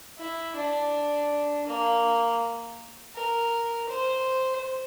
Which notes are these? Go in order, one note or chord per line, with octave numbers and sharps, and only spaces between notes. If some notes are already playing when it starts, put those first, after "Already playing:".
E4
D4
A#3
A#4
C5